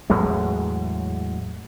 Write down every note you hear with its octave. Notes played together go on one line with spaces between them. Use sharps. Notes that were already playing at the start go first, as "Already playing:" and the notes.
E2 A2 F#3 G#3